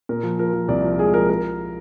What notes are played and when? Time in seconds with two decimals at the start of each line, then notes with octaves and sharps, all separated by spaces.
0.09 A#2 A#4
0.23 F3
0.39 F3 A#4
0.53 F3
0.68 C2 D5
0.84 F3
0.99 G#3 G#4
1.14 F3 A#4
1.29 A#4